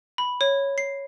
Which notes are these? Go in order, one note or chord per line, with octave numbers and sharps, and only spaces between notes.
B5
C#5
C7